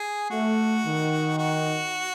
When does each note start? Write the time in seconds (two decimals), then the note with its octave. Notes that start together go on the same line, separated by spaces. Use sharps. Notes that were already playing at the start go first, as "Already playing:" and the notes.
Already playing: G#4
0.30 A3 F#4
0.85 D#3
1.38 F#4